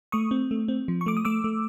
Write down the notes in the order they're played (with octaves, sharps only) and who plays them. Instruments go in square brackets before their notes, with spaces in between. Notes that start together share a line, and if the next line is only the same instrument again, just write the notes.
[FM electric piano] A3 C#6 D#6
C4
A3
C4
F3
C#6
A3 D6
D#6
A3 D6 E6
A3